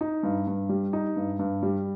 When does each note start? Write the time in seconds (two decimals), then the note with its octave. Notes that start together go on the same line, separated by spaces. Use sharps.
0.01 D#4
0.23 G2
0.47 G2
0.69 G3
0.93 D#4
1.17 G2
1.39 G2
1.63 G3